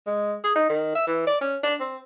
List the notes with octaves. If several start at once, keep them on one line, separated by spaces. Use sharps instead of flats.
G#3
G#4
D#4
D#3
E5
E3
D5
C#4
D4
C4